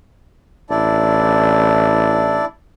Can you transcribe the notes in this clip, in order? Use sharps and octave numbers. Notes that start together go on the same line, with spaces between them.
A1 D4 E4 D5